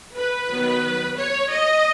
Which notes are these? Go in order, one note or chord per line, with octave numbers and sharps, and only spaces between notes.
B4
D#3 F#3 B3
C#5
D#5